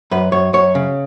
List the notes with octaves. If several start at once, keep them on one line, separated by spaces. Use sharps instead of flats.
F#2 B4
F#2 C#5
F#2 C#5
C#3